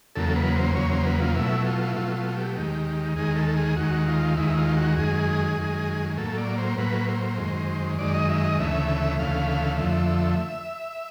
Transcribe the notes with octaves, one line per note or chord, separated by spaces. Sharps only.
E2 C#3 F#3 A#3 A4
B4
C5
E2 C#3 F#3 A#3 C#5
C5
B4
F4
B2 F#3 A3 E4
F4
E4
B2 F#3 A3 F4
F4
G4
D#2 D#3 G#3
D#2 D#3 G#3 G#4
A4
G#4
D#2 D#3 G#3 F#4
F4
D#2 D#3 G#3 E4
F4
F#4
F#2 D#3 G#3 G#4
F#2 D#3 G#3
A2 F#3 A#3 A4
D5
C5
A2 F#3 A#3 B4
C5
F#2 D#3 G#3
F#2 D#3 G#3 D5
D#5
E5
D#5
D2 C#3 E3 A3 E5
E5
D2 C#3 E3 A3 F5
F2 D3 F3 A3 E5